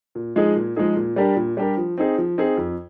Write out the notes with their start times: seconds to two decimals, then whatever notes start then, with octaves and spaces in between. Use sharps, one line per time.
0.15 A#2
0.36 F3 G#3 D#4 G#4
0.56 A#2
0.76 F3 G#3 D#4 G#4
0.96 A#2
1.16 G3 D4 G4 A#4
1.36 A#2
1.57 G3 D4 G4 A#4
1.77 F3
1.98 C4 D#4 G#4
2.18 F3
2.38 C4 D#4 G#4
2.57 F2